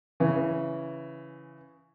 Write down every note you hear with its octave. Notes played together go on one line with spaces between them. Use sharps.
C#3 E3